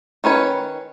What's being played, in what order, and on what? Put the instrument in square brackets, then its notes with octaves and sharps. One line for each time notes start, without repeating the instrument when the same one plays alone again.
[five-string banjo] D#3 C#4 B4 C#5